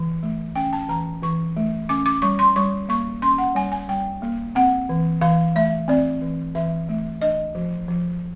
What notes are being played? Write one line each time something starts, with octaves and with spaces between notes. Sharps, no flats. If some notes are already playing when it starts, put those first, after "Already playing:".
Already playing: E3
A3
C#4 G5
A5
E3 A#5
E3 C#6
A3
C#4 D6
D6
G3 C#6
C6
G3 C#6
A#3 C#6
C#4 C6
F#5
G3 G#5
G#5
G3 G5
A#3
C4 F#5
E3
E3 F5
A3 E5
C4 D5
E3
E3 E5
A3
D4 D#5
F3
F3